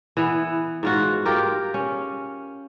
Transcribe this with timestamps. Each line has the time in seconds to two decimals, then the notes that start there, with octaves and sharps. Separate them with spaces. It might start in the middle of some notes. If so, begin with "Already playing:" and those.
0.17 E3 B3
0.83 G#2 F4 F#4
1.25 F4 G4 A#4
1.74 C#4